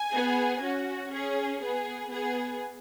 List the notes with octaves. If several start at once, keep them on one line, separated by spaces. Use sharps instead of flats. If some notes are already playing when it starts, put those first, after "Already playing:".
Already playing: G#5
B3 G#4
C#4 F#4
C#4 G#4
B3 G#4
B3 G#4